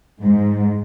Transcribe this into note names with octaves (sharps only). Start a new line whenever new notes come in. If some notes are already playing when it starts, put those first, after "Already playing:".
G#2